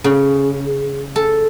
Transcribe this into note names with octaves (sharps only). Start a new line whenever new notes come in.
C#3
A4